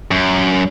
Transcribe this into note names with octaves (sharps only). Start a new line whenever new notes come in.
F#2